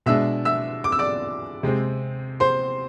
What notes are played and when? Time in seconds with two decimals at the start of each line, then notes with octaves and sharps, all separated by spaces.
0.06 B2 G#3 D4 E5 E6
0.45 E5 E6
0.84 D6
0.92 E6
0.99 D5 D6
1.63 C3 G#3 C4
2.40 C5 C6